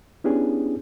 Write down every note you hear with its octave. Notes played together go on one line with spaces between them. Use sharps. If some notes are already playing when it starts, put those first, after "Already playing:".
B3 C#4 D4 E4 G4 G#4